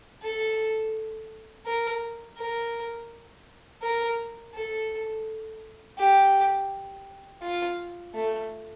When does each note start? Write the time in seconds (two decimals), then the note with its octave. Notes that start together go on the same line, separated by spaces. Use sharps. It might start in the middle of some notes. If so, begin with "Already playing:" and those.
0.22 A4
1.66 A#4
2.38 A#4
3.82 A#4
4.54 A4
5.98 G4
7.42 F4
8.14 A3